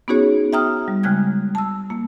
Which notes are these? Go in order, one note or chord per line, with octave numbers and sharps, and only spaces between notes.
B3 C#4 D#4 F#4 G#4 C#5
E5 G5 A#5 D#6 F6
G3
C#3 G#3 G5 F#6 G#6
A5 E6
A#3